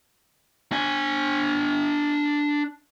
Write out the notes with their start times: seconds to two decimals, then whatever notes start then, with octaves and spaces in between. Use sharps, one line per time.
0.72 D4 G#5